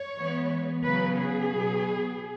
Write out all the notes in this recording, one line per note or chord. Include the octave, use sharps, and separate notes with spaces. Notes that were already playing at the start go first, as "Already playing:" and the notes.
Already playing: C#5
E3 G#3 B3
C#3 F#3 B3 B4
G#4
B2 F#3 B3